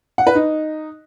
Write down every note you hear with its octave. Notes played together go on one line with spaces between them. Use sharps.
F#5
B4
D#4